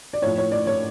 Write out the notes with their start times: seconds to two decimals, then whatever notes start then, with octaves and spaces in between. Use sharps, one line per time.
0.13 D5
0.22 A2 F3 C#5
0.38 C#5
0.52 D5
0.67 C#5